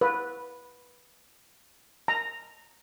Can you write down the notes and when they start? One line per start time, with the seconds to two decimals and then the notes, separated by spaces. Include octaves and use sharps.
0.01 B4
2.08 A#5